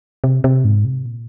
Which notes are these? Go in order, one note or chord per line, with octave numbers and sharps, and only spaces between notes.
C3
C3
G#2
C3
A#2